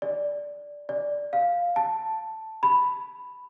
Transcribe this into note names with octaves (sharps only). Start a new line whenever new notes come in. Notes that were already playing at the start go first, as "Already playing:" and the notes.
D5
D5
F5
A5
B5